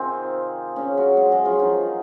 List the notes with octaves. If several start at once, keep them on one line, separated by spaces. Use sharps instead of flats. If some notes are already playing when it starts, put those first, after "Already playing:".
Already playing: C3 D#3 C4 D#4 F4 G#4
C#3 C#4
F#3 F#4
G#3 G#4
F#3 F#4
F3 F4
D#3 D#4